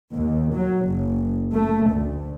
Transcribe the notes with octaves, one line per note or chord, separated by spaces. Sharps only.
D#2
F#3
F#1
A3
D2